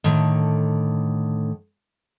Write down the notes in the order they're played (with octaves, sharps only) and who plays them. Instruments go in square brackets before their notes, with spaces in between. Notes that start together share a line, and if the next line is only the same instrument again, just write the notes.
[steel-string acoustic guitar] A2 D3 D#3